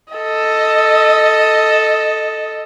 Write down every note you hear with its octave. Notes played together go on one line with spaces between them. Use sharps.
A4 D#5